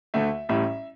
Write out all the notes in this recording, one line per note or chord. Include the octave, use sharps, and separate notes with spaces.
D2 D3 A3 E5
A1 A2 G3 E5